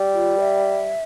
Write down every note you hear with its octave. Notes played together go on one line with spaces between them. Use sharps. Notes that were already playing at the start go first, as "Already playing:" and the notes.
Already playing: G3
F4
E5